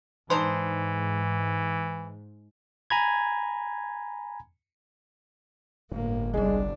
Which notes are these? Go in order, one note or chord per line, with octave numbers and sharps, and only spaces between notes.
G#2 E3 D4 D#4 C5
G#5 A#5 B5 G#6
G1 A2 A#3
C2 C3 G3 G#3 D4